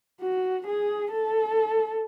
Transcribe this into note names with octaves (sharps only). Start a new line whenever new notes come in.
F#4
G#4
A4